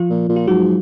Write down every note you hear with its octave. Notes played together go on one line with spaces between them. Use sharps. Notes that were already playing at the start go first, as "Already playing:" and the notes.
Already playing: F3 F4
A#2
A#2
F4
G#2 F#3 F#4